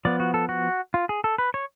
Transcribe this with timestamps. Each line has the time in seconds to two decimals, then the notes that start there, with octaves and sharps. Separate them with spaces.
0.05 F3 B3 D5
0.20 F#4
0.34 A4
0.49 F#4
0.94 F4
1.09 G#4
1.24 A4
1.38 B4
1.54 C#5